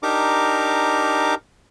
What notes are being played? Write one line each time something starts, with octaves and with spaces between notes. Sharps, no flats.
D4 D#4 G4 A#4 A#5 D6